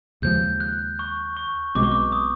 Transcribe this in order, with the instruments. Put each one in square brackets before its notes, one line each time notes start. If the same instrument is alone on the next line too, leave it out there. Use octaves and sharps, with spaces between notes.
[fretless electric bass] D#2 C#3 F3 G#3 [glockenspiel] G6
[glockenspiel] F#6
C#6
C#6
[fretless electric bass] B1 B2 G#3 C4 [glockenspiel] D6
[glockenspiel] C#6
D6
D#6